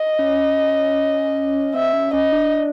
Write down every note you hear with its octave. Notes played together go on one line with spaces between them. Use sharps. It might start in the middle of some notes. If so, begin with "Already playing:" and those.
Already playing: D#5
C#4
C4 E5
C#4
C#4 D#5
D4